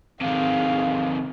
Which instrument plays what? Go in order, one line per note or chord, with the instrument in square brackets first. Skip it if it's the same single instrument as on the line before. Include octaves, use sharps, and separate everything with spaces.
[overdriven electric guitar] C3 D#3 [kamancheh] G#4 F5